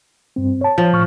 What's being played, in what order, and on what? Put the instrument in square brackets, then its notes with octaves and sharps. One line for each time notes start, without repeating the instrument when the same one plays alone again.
[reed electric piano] G2 C4
C#5 A5
[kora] F3
[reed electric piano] A2 C#6 F6